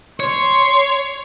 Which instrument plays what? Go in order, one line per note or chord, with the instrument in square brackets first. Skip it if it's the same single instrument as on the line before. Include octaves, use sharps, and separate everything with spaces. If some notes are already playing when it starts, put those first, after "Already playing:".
[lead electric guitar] C#5 [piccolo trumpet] C6